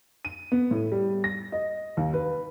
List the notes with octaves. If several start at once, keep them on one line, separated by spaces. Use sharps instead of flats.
D#7
B3
A2
G3
A#6
D#5
D#2
B4